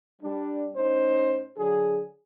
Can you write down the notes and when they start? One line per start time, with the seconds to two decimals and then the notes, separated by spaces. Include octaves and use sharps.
0.22 G3 D4
0.75 A2 C#4 D#4 C5
1.58 D3 F#3 G#4